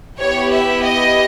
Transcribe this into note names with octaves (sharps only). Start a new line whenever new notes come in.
B3 E4 G4 C#5
E5
D#5